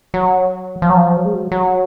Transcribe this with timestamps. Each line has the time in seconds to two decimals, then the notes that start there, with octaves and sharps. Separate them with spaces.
0.14 F#3
0.82 F3
0.90 F#3
0.97 F3
1.17 F#3
1.25 G#3
1.34 F#3
1.52 F#3